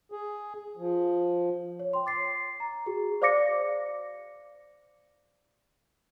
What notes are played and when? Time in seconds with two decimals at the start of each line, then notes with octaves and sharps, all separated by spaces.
0.12 G#4
0.77 F3
1.80 C#5
1.93 G5 C6
2.06 D6 A6 C7
2.60 A#5
2.86 F#4 G#4
3.22 C5 D5 F5 D6 A#6 C#7